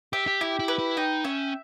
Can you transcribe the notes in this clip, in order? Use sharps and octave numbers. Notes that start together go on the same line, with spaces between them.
G4 E5
G4
E4 G4
E4
B4
E4
D#4 G5
C#4 E5